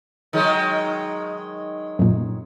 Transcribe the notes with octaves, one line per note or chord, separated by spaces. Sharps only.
D#3 F#3 G#3
F#2 A#2